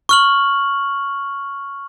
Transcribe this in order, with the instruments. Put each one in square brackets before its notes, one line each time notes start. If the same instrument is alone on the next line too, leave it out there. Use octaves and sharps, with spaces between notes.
[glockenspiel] C#6 F6 F#7